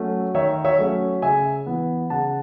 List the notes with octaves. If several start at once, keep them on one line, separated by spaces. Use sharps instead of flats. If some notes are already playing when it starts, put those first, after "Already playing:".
Already playing: F#3 A3 C#4
D#3 C#5 E5
C#5 E5
F#3 A3 C#4
C#3 E5 G#5
E3 B3
C#3 F#5 A5